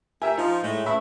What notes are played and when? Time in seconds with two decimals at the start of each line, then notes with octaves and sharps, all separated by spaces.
0.22 A3 G4 A#4 E5 G#5
0.38 F3 D#4
0.63 A2 G#3 A3
0.86 C#3 A3 E4 B4 E5